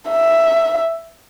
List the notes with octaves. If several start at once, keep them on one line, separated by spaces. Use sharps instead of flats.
E5